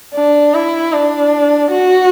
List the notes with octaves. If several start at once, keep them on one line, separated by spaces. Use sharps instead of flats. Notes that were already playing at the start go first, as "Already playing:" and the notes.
D4
E4
D4
F#4